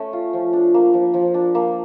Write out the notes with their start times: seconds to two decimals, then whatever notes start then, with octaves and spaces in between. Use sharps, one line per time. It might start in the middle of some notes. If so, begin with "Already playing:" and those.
Already playing: A3 C#4
0.13 F4
0.33 F3
0.53 D4
0.74 A#3
0.94 F3
1.14 F3
1.34 D4
1.55 A#3